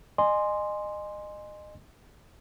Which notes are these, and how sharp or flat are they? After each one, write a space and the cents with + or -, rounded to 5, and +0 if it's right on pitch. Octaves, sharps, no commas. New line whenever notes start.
D#5 -30 G#5 +0 C6 +0